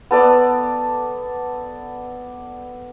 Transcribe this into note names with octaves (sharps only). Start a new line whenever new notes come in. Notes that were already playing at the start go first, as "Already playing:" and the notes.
B3 A4 D5